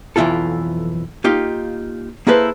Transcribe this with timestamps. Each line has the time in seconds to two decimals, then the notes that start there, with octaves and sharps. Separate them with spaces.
0.16 B1 F2 E3 E4 F4 A4
1.24 A#3 D#4 F4 G4
2.27 A#3 E4 G#4 A4 B4 C5